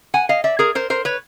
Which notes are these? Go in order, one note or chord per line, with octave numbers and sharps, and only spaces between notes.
F#5 G#5
D#5 F5
D5 E5
G#4 A#4
A#4 C5
A#4 C5
B4 C#5